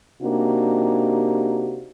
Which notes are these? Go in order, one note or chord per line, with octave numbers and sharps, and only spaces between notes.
C3 A#3 D4 D#4 F#4 G4